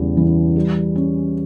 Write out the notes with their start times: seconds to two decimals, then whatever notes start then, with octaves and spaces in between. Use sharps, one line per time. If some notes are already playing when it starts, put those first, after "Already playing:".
Already playing: E2 C#3 G3
0.17 E3
0.56 G3
0.96 C#4